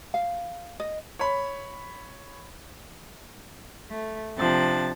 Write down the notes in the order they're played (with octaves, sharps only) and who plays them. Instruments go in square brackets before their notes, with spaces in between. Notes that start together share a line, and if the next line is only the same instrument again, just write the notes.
[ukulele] F5
D#5
[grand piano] C#5 B5
[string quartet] A3
C3 F3 D4 A6